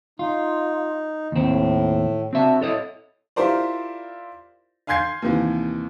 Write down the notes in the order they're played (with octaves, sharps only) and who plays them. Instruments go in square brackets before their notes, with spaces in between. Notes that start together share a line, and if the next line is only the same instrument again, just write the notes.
[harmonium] D#4 [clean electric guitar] F4
[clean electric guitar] D#2 C4 [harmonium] A2
[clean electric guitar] C4 E5 [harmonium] D4 F#4
[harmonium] E4 [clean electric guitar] A4 C#5 D#5
[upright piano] E4 F4 G4 A#4 C5 D5
F5 G#5 C6 G6 G#6 C7
D#2 C3 D#3 E3